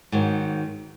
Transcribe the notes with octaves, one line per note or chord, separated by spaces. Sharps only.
G#2 D#3 F#3